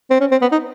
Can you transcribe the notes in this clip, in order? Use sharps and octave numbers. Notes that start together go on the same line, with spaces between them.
C4
C#4
C4
B3
D#4